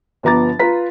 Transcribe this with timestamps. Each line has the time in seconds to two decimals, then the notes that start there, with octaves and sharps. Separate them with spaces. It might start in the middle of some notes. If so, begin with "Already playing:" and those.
0.23 G1 F3 B3 A#5 D6 A6
0.59 F4 B4 A#5 B6